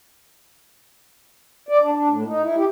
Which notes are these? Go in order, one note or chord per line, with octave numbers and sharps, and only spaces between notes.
D5
D4
D4
A2
D#4
E4
G4